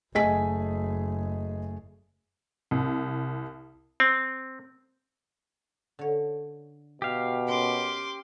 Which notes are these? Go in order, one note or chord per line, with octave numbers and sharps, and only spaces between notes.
F#1 A3 G#4 D#5 G#5 B6
C2
C4
D3 C#5
B2 G4 F5
A#3 C#4 B4 C6 D6